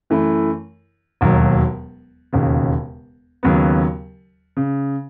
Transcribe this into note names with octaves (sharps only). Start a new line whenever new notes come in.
F#2 E3 A3 E4
E1 D#2 D#3 F#3
E1 D#2 C#3
D#2 C#3 F#3 B3
C#3